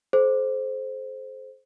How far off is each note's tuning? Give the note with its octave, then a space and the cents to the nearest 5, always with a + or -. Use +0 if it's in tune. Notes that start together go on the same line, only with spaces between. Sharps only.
A4 -45 C5 +0